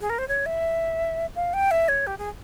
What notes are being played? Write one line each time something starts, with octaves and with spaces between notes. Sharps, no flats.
G#4
A#4
C5
C#5
E5
F5
G5
E5
C#5
G4
G#4